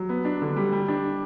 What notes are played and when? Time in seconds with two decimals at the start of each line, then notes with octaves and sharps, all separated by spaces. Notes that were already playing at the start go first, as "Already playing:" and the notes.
Already playing: F#3
0.09 B3
0.25 D4
0.42 D3
0.57 G3
0.73 G3
0.88 D4